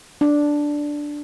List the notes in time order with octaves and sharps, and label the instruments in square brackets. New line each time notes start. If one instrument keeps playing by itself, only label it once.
[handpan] D4